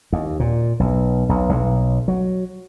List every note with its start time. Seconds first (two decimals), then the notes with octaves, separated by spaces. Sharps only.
0.12 D#2
0.40 A#2
0.80 B1
1.29 B1
1.49 B1
2.08 F#3